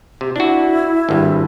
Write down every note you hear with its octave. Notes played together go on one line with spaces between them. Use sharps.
C3
D4 E4 F#4
G#1 G2